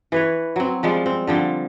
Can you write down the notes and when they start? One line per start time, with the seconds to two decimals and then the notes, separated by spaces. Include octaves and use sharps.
0.12 E3 B4 C#5
0.56 F#3 C4
0.83 F3 G3 G#3
1.06 C4
1.27 D3 F3 G3